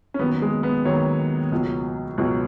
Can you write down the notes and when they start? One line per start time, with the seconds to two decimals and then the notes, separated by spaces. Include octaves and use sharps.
0.14 C#4
0.19 D#2 D#3 F#3 B3
0.42 G#3
0.63 B3
0.85 D#2 D#3 F#3 C#5
1.52 C#2 B2 F#3
2.18 C#2 B2 F#3